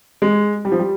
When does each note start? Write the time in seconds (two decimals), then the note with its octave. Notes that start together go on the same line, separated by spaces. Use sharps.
0.22 G#3
0.65 G3
0.72 F3
0.79 G3